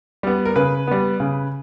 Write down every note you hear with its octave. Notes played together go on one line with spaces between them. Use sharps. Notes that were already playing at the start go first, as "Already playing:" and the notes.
G3 B3
A#4
C#3 B4
G3 B3
C#3